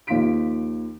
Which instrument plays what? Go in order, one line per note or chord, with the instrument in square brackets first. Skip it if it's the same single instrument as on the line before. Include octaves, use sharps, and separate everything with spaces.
[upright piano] D#2 F3 F5 C6 B6 D7